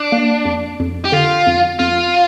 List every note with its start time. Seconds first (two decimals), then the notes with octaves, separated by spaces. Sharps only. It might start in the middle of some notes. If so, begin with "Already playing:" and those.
Already playing: D4
0.12 A#3
0.45 F2
0.80 F2
1.05 G4
1.12 D3 F4
1.47 F2
1.79 F2 F4